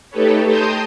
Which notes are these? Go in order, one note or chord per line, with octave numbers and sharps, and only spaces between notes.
A3 D#4 G4 A4 B4 C#5
G5 A5 A#5 C6 D#6 G6